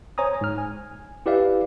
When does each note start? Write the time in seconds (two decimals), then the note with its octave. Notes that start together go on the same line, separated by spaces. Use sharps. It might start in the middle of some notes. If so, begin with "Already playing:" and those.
0.18 C5 C#5 G#5 A#5 D#6
0.41 G#2 F6
0.58 G#5
1.26 E4 G4 B4 D5 E5 F5